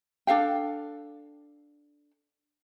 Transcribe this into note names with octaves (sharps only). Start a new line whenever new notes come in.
D4 A4 F5 G5